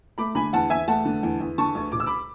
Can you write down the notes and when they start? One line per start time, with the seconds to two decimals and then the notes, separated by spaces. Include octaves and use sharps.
0.18 A3 B5 D6
0.35 D3 G#5 B5
0.53 E2 F#5 A5
0.70 E2 E5 G#5
0.88 A3 F#5 A5
1.05 D3
1.23 E2
1.40 E2
1.58 D3 A5 C#6
1.75 D2
1.92 E1 D6
2.00 E6
2.06 B5 D6